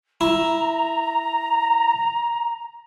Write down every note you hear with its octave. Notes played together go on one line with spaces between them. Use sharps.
E4 A#5